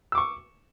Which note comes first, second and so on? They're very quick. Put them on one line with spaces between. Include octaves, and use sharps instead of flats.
E6 D6 C#6